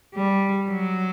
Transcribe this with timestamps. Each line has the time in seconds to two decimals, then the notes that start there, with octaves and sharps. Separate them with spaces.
0.15 G3
0.70 F#3